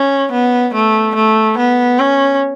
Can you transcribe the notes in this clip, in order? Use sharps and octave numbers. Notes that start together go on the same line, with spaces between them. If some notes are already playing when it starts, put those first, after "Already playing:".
Already playing: C#4
B3
A3
A3
B3
C#4